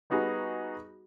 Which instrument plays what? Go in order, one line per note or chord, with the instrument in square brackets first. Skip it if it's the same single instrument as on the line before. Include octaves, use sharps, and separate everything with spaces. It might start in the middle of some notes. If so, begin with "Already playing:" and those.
[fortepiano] G3 B3 D#4 F#4 G#4